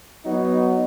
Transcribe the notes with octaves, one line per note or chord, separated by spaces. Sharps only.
F#3 B3 D#4